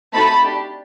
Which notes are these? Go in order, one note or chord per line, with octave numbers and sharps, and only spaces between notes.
A3 C4 D#4 F#4 A4 A5 B5
D4 G4